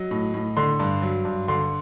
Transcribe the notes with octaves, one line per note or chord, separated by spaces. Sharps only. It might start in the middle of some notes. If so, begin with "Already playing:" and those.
Already playing: F#3 D#5
A2
A2
D3 C6
G2
F#3
G2
D3 C6